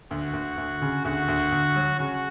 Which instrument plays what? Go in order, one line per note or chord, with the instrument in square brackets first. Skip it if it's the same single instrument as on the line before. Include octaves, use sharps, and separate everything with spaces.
[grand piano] D2 [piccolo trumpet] F#4
[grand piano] D2
D2
C#3
[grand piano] D2 [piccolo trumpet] F#4
[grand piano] D2
D2
F#3
[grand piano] C#3 [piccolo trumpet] F#4